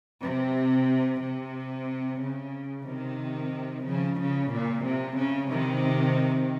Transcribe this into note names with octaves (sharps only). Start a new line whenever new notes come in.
C3
C3
C#3
C3 D#3
C#3 F3
C#3
A#2
C3
C#3
C3 D#3